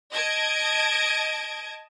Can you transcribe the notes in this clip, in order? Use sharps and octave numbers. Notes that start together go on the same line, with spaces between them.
D#5 A5 G#6 D7